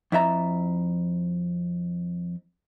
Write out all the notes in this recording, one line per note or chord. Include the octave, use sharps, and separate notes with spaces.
F2 E4 E5 A#5